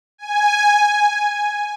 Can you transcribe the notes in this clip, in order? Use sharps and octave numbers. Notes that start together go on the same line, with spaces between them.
G#5